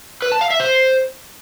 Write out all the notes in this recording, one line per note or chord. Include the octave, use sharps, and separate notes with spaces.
B4
A5
F5
E5
C5